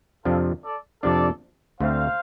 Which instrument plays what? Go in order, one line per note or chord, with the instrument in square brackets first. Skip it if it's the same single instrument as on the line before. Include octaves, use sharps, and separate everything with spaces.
[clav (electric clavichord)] F2 C3 F3 D4 [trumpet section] F4 A4
[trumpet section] A4 D5
[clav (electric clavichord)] F2 C3 F3 D4 [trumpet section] A4 D5
[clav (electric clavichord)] D2 D3 A3 C4 [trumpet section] C5 F5